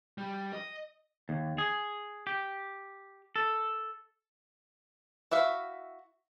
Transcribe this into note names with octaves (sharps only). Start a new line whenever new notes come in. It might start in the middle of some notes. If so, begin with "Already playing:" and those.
G3
D#5
D#2
G#4
G4
A4
E4 F#4 E5 F5